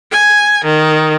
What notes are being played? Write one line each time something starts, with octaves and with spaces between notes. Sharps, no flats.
G#5
D#3